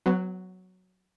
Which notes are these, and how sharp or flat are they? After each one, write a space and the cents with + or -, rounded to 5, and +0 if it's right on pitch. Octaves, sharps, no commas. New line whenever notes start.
F#3 +0 B3 +30